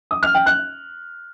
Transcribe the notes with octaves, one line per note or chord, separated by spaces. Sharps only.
D#6
F6
G5
F#6